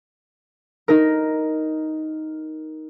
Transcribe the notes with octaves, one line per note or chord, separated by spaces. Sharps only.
D#4 A#4